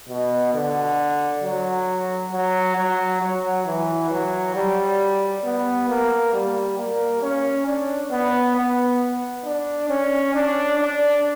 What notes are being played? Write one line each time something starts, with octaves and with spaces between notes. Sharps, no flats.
B2
D3
F#3
F#3
F#3
F#3
E3
F#3
G3
B3
A#3
G3
A#3
C#4
D4
B3
B3
D4
C#4
D4
D4